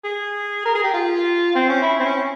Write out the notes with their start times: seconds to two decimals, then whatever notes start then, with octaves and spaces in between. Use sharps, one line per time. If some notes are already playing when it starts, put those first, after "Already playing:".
0.04 G#4
0.65 A#4
0.75 G#4
0.84 G4
0.94 F4
1.55 C4
1.69 C#4
1.82 E4
2.00 C4
2.05 C#4